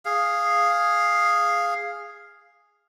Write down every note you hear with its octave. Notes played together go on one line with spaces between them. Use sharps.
G#4 F5